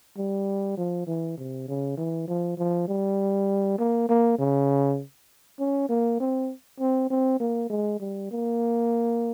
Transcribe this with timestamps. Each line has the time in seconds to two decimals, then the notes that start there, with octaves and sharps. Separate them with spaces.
0.17 G3
0.77 F3
1.07 E3
1.37 C3
1.68 C#3
1.97 E3
2.27 F3
2.58 F3
2.88 G3
3.79 A#3
4.09 A#3
4.39 C#3
5.60 C#4
5.89 A#3
6.20 C4
6.80 C4
7.11 C4
7.40 A#3
7.70 G#3
8.00 G3
8.31 A#3